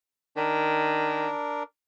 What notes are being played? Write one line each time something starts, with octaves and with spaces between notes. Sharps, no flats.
D#3 D4 A#4